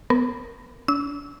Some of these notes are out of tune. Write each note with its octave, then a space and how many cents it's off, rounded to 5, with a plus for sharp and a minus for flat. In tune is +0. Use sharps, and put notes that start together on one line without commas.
B3 +15 A#4 +0
D4 -45 E6 -25